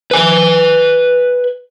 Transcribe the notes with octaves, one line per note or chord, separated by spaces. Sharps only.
B4 G#5